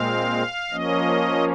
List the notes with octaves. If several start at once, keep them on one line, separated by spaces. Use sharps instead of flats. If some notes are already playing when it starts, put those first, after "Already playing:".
Already playing: A#2 G#3 C4 F5
F3 A#3 C#4 D#5